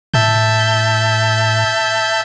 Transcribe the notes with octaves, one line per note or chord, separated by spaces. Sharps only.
A2 E5 A5 G6